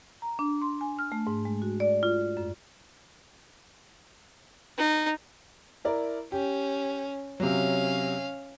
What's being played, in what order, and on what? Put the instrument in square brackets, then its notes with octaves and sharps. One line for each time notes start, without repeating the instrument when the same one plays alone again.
[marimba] A#5
D4
C6
G#5
F6
A3
G#2
G#3
F#4
D5
F4
F#2
[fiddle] D#4
[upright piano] E4 A#4 D5
[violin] C#4 [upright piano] G4
[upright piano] C3 F#3 [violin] C#4 F5